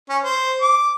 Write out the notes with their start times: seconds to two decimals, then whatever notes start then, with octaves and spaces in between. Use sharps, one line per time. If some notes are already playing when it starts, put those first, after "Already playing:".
0.09 C#4
0.24 C5
0.61 D6